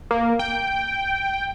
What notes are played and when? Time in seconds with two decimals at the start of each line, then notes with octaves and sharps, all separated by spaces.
0.11 A#3
0.39 G5